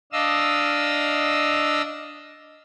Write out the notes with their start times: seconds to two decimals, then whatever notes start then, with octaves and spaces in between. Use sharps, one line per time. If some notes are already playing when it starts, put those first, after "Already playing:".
0.12 D4 D#5 F5 E6